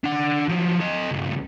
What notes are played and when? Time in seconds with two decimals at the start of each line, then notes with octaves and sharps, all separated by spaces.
0.04 D4 F#5
0.49 F3 F#3
0.80 A4 D#5
1.11 C#2 G2